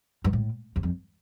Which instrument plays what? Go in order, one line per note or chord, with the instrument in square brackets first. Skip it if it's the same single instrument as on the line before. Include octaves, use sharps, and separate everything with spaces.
[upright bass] G2
A2
E2
F2